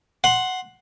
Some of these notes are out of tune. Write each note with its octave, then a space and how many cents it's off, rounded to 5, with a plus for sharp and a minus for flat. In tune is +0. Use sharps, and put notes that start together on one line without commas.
F#5 +0 C6 +10